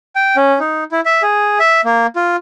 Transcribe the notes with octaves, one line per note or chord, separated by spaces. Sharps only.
G5
C#4
D#4
E4
E5
G#4
E5
A#3
F4